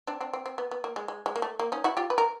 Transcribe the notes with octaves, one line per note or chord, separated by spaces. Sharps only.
C4 D4
C4 D4
C4
C4
B3
B3
A#3
G#3
G#3
G#3
A#3
A3
A#3
C#4 D#4
E4 F#4
F4 G4
B4
A#4